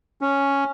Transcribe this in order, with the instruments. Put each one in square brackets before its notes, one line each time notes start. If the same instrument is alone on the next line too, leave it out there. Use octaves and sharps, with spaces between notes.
[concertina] C#4